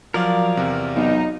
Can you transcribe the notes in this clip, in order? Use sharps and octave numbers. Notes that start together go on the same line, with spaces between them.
F3 F#3 A#4 D5 F5
E2 C3
B1 D#4